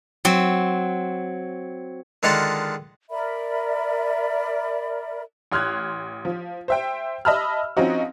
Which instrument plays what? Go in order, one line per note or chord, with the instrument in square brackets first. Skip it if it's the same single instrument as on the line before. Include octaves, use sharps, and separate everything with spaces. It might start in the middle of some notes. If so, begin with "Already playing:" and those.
[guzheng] F#3 C4
[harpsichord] D3 D#3 G#3 F4 F#5 A5
[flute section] A#4 D5 E5 B5
[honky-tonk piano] A1 C6 F6 F#6 G#6
F3
C5 E5 G5
D#5 E5 A5 B5 E6 F6
F3 C4 C#4 D#4 F#4